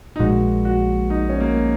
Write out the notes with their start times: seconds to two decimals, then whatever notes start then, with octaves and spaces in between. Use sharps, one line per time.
0.16 D#4
0.19 A#1 A#2 G#3 F#4
0.65 F#4
1.10 D#4
1.29 C#4
1.40 A#3